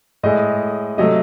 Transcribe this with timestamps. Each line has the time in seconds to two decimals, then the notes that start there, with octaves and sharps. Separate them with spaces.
0.23 A2 G#3 D#5
0.98 C3 F#3 A3 D#5